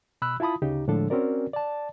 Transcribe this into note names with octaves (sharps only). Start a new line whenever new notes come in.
B2 B5 E6 F#6
E4 F4 A5 B5 D#6
D2 C#3 D#4 G4
A2 D3 F3 G#3 D4 A4
C4 C#4 F#4 A#4 D5
D5 A5